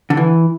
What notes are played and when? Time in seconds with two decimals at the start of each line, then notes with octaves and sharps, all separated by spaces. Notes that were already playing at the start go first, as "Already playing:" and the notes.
0.10 D3
0.17 E3